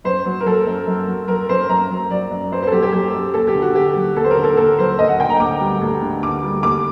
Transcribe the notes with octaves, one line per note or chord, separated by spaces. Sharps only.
F#2 C5
F#3
A#4
F#3 A4
F#2
F#2
F#3
F#3 A#4
F#2 C5
F#2 A#5
F#3
F#3 D5
F#2
F#2 C5
C5
A4
F#3 G4
G4
F#3 G4
F#2
D#2 A4
G4
D3
F#4
D#2 G4
F#3
D#2 A4
C5
A#4
D3
A4
D#2 A4
F#3 C5
D2 D#5
F#5
D3 G5
A#5
D2 D6
G3
D2
D3
D2 D6
G3
D#2 D6